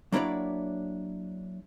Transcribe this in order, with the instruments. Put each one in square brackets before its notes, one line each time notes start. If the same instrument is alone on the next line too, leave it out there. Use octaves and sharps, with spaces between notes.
[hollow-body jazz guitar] F#3 A#3 D4 E4 C#5 D5